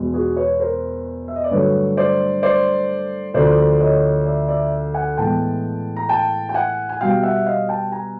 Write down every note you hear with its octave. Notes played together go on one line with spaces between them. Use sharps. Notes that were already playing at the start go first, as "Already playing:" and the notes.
Already playing: E2 B2 G#3
F#4 G#4
B4 C#5
A#4 C5
E5
D#5
D5
G2 D3 F#3 A3 B4 C#5
C5 D5
C5 D5
D2 D3 F3 C5 D5
C#5 D#5
D5 E5
D5 E5
F#5 G#5
A2 E3 G#3 B3 G5 A5
A#5
G5 A5
G5
F#5 G#5
G#5
B2 G3 B3 F5 G5
E5 F#5
D#5 F5
G5 A5
G#5 A#5